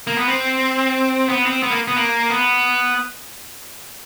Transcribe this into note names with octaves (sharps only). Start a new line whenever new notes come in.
A#3
B3
C4
B3
C4
B3
A#3
B3
A#3
B3